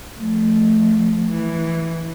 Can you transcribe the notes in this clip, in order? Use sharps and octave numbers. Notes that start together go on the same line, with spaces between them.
F3 A3
E3